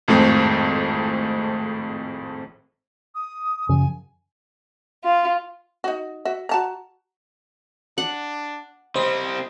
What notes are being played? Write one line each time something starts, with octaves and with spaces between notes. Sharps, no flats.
G#1 F2 A2 G#3 C4
D#6
F#2 C#3 F3 G#5
F4
D#4 F#4
F#4 E5
F#4 A5 A#5
D4 F#5
G3 C4 C5 D#5